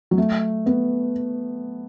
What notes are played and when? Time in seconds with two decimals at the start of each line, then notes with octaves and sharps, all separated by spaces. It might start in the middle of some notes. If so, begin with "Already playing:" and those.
0.11 F#3
0.18 A3
0.66 B3